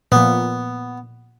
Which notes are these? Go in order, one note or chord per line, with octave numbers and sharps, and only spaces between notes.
A#2 F3 B3